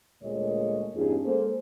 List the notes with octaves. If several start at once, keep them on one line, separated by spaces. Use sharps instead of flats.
D2 A#2 G#3 A#3 C#5 D#5
E2 G2 C#4 D#4 F4 G#4
G#3 A#3 A4 C5